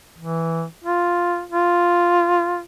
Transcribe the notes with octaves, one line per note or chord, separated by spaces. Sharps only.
E3
F4
F4